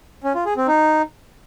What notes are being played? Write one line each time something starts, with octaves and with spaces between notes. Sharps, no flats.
C#4
F4
G#4
C4
D#4